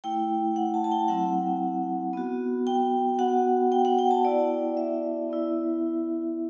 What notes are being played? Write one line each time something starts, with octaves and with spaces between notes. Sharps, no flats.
A3 E4 G5
F#5
A5
A5
G5
F#3 C4 E4 F#5
B3 F#4
G5
B3 F#4 F#5
G5
F#5
G5
A5
B3 E4 D5
E5
B3 E4